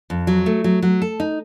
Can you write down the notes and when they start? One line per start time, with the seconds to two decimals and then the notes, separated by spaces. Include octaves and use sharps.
0.10 F2
0.27 F#3
0.46 A3
0.64 F#3
0.82 F#3
1.02 A4
1.20 D#4